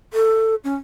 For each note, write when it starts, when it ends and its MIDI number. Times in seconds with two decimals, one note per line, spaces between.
0.13 0.55 69
0.64 0.75 61